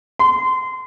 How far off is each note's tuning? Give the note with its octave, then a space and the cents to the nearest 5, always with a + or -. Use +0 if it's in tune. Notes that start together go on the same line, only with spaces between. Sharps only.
C6 -25